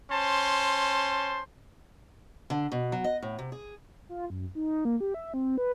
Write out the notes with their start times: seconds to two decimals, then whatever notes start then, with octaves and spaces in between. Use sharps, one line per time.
0.10 C#4 C5 A5 C6
2.50 D3
2.72 B2
2.92 F#3
3.04 D#5
3.23 A2
3.39 C3
3.52 G#4
4.09 F4
4.30 F#2
4.55 D#4
4.85 A#3
5.01 G4
5.14 E5
5.34 C4
5.58 B4